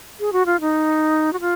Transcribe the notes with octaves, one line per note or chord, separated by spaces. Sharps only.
G#4
F#4
F4
D#4
F#4
F4